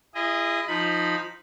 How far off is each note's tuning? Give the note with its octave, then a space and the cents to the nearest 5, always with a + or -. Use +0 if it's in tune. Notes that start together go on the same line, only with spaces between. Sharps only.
E4 +35 G#4 -25 D#5 +0
F3 +0 D#4 +0 B5 +0